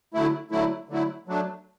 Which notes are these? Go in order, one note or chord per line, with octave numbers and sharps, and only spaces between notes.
D3 F#3 A3 E4
D3 F#3 A3 E4
D3 F#3 A3 E4
F#3 A3 D4